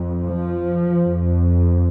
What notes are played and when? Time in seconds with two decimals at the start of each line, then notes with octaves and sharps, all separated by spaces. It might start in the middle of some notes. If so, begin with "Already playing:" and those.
Already playing: F2
0.26 F3
0.99 F2